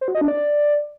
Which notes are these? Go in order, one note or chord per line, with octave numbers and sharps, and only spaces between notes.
C5
F#4
D#5
D4
D5